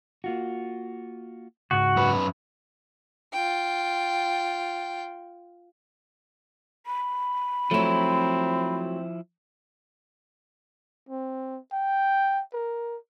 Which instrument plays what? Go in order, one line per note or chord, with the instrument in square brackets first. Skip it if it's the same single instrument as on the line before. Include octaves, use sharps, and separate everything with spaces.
[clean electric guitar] A#3 F4 F#4
[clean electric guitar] C#2 G#2 [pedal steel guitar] F#4
[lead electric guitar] F#2 B4
[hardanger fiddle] F4 G5
[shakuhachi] B5
[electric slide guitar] F3 E4 [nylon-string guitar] F#3 A3 [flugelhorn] C4
[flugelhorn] C4
G5
A#4